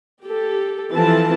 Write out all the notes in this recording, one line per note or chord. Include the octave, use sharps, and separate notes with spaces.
G4 A4
E3 F3 C4 A4 A5